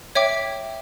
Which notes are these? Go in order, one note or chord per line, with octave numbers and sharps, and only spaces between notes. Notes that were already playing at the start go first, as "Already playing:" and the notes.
C#5 E5 G5 D6